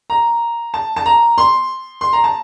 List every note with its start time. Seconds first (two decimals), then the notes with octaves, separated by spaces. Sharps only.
0.10 A#5
0.74 A5
0.96 A5
1.06 A#5
1.38 C6
2.01 C6
2.13 A#5
2.24 A5